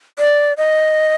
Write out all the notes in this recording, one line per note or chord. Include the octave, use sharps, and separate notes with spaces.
D5
D#5